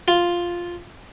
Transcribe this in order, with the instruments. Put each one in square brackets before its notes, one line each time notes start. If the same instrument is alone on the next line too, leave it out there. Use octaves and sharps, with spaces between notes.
[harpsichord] F4